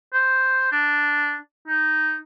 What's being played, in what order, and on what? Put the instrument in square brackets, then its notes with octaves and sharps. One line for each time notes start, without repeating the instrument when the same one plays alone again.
[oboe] C5
D4
D#4